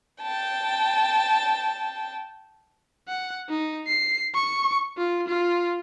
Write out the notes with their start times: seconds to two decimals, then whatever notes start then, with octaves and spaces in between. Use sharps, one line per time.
0.22 G5 A5
3.09 F#5
3.50 D#4
3.87 C7
4.35 C#6
4.98 F4
5.28 F4